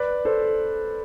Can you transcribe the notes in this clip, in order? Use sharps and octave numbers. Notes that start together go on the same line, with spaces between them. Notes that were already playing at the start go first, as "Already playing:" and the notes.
Already playing: B4 D5
A4 C5